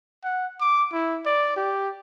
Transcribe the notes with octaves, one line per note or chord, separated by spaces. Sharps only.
F#5
D6
E4
D5
G4